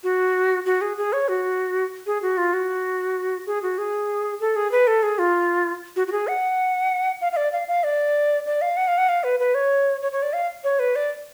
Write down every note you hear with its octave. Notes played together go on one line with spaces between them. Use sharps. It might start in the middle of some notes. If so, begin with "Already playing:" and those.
F#4
F#4
G#4
G#4
C#5
F#4
G#4
F#4
F4
F#4
G#4
F#4
G#4
A4
G#4
B4
A4
G#4
F4
F#4
F#4
G#4
F#5
F5
F5
D5
F5
F5
D5
D5
F5
F#5
F5
F#5
F5
B4
B4
C#5
C#5
C#5
D5
F5
C#5
B4
D5